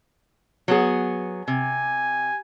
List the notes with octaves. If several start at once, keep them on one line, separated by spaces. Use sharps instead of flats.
F#3 B3 G#4
C3 G#5